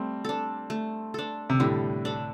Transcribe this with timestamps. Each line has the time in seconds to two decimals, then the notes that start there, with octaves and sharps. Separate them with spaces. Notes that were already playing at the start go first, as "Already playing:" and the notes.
Already playing: G3 A3 C4
0.25 D4 A4
0.70 A3
1.14 D4 A4
1.50 C3
1.60 A2 D3 G3
2.05 D4 A4